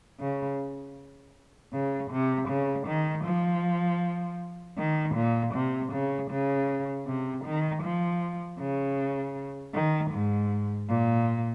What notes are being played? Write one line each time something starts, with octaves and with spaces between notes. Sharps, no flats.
C#3
C#3
C3
C#3
D#3
F3
D#3
A#2
C3
C#3
C#3
C3
D#3
F3
C#3
D#3
G#2
A#2